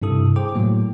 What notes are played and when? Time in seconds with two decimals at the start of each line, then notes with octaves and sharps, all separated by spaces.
0.02 G2 C3 E4 A4 D#6
0.36 G#4 C5 G5 D6
0.55 A2 F#3 A#3